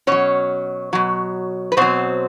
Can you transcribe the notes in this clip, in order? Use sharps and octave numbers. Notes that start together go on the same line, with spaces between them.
B2 F#3 C#4 C#5
B2 F#3
B4
B2 F#3 C4 C5